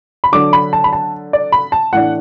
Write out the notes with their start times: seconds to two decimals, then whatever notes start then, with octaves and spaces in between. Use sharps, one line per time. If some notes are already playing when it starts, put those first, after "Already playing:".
0.24 B5
0.32 D3 F#3 D4 D6
0.53 B5
0.73 A5
0.84 B5
0.93 A5
1.33 D5
1.52 B5
1.72 A5
1.93 A2 E3 D4 F#5